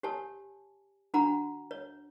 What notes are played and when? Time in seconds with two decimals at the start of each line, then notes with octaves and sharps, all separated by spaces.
0.03 G4 C#5 G#5 A5
1.14 D4 F#4 F#5 G#5 A#5 B5
1.71 C#5